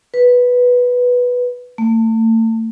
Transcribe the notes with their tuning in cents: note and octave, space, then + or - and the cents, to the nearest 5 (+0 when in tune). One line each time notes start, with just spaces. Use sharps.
B4 -5
A3 +35